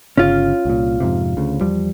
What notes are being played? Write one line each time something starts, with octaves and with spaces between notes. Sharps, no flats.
G1 C#3 C#4 F4
C2 A#2
F2 G#2 C3
D2 C#3
E2 F3 G3